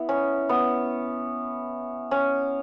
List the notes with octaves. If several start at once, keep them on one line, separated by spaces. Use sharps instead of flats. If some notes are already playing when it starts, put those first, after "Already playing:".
Already playing: B3 E4
C#4
B3
C#4